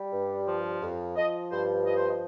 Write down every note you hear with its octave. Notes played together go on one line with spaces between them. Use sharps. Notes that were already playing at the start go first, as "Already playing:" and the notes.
Already playing: G3
G2
F3
F2
F3 D#5
G2 C5
F3 D#5
C5
D#5